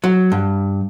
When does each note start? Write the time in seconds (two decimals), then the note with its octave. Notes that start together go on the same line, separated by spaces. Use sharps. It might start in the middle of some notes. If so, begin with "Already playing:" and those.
0.04 F#3
0.32 G2